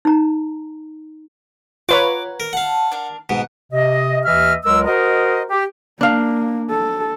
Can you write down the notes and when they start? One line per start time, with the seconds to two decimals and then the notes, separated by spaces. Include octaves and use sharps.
0.05 D#4 A#5
1.89 F4 B4 C#5 F#5 G#5 A#5 D6
2.40 A#4
2.53 F5 F#5 A5
2.92 D4 A#4
3.29 G#2 B2 F#5
3.71 C3 D#5
4.25 D#2 E3 D#5 E5 F6
4.65 C#2 F#3 G#3 A#4 E6
4.86 F#4 A#4 C5 D#5
5.50 G4
6.01 A#3 D4 F5
6.70 A4